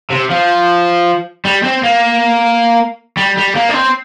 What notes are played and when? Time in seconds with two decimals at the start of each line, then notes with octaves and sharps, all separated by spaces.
0.10 C3
0.30 F3
1.45 G3
1.63 C4
1.83 A#3
3.17 G3
3.37 G3
3.56 A#3
3.70 D4
3.75 C4